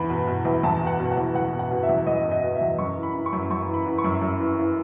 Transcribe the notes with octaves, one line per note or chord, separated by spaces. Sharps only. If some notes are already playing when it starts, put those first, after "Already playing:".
Already playing: E2 B5
B2
B2
E2
E2 A5
B2
F#5
B2
F#5
E2
E2 F#5
B2
F#5
B2
E5
E2
E2 D#5
B2
D#5
B2
E5
E2
F#2 C#6
E3
B5
E3
C#6
F#2
F#2 C#6
E3 B5
E3
C#6
F#2
F#2
E3
E3